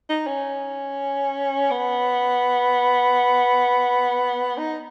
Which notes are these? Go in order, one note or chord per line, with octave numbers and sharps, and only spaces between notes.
D#4
C#4
B3
D#4